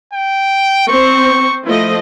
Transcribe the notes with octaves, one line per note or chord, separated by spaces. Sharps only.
G5
C4 C5 C#6
F3 A3 E4 D#5